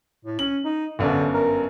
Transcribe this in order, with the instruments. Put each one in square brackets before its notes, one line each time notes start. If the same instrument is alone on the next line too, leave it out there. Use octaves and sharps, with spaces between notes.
[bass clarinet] A2
[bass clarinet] C#4 [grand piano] F#7
[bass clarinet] D#4
[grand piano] G1 F#2 D4 [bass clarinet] D3
[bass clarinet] A#4